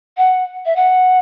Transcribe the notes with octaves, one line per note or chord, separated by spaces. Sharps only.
F#5
E5
F#5